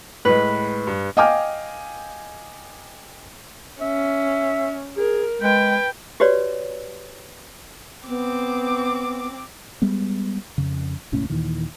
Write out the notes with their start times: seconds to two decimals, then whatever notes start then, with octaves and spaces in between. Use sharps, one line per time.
0.25 A2 G#3 B4
0.87 G2
1.17 D#5 F5 G5 G#5 D6 F6
3.81 C#4 E5
4.97 G#4 A#4
5.42 G#3 B4 G5
6.20 F#4 G4 B4 C#5 D5
8.08 B3 C4 D6
9.82 G3 G#3 B3
10.58 F2 C#3
11.12 E1 C#2 A2 C#4
11.30 D#2 A#2 D#3 E3